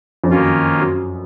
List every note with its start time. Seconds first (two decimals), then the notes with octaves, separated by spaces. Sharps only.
0.24 F2
0.30 F#2 D#3 A#3 C#4 F4
0.81 F#2